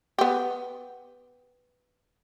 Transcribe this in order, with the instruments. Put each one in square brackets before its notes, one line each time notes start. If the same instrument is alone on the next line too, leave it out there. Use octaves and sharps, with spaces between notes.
[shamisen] B3 G4